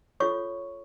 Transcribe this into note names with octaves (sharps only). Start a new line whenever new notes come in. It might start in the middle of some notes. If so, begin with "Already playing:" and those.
F4 A4 C#5 C#6